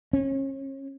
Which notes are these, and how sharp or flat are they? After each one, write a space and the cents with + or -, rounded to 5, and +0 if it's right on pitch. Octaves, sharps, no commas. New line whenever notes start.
C#4 -35